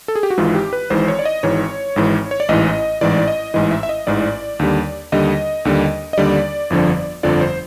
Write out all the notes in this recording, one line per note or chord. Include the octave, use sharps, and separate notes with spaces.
A4
G#4
G4
F#4
G#1 G#2 E3 F4
G4
B4
G#1 G#2 E3 C5
C#5
D5
D#5
G#1 G#2 E3 C#5
G#1 G#2 E3
C#5
D5
A1 G#2 E3 D#5
A1 G#2 E3 D5
D#5
A1 G#2 E3 D#5
E5
E5
D#5
A1 G#2 E3 D5
D#2 D3 G3
D#2 D3 G3 D#5
D#2 D3 G3
D#5
D#2 D3 G3 D5
G1 F2 D3 F3
G1 F2 D3 F3 D5
C5